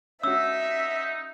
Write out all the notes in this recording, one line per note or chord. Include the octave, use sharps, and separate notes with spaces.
C#4 D#4 F#4 E5 E6